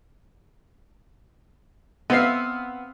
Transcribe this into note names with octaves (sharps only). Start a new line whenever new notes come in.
B3 C4 E5 F5